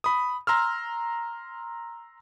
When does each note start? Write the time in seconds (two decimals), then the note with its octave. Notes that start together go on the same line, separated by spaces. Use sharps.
0.04 B5 D#6
0.47 A#5 C6 E6 F6